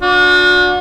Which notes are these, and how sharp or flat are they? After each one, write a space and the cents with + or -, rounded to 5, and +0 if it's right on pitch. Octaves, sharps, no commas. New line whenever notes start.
D4 -20 F#4 -40